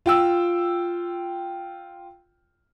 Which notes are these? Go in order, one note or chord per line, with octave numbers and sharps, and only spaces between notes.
F4 G5 E6